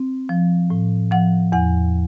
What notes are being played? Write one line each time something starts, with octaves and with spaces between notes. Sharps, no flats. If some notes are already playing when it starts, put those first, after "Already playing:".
Already playing: C4
F3
A2
F3 F#5
E2 F#5